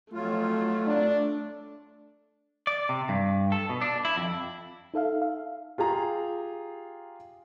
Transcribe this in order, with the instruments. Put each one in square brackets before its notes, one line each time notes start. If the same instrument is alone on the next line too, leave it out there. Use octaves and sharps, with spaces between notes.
[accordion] F2 F#3 F4 [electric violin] A3
[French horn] D4
[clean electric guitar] D5
C3
G2
A4
B2
D4
E4
F2
[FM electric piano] D#4 A4 E5 F5
F5
[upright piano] F4 G4 G#4 A#5